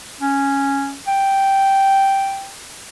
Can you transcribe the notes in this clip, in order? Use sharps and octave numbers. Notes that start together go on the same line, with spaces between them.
C#4
G5